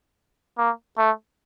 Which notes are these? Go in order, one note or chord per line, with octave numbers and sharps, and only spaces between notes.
A#3
A3